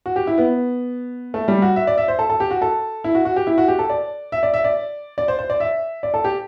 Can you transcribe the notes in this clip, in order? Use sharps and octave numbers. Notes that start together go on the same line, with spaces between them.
F#4
G4
E4
B3
A3
G3
F#4
E5
D5
E5
C5
A4
A4
G4
F#4
A4
E4
F#4
F#4
G4
E4
F#4
G4
A4
D5
E5
D5
E5
D5
D5
C5
C5
D5
E5
D5
A4
G4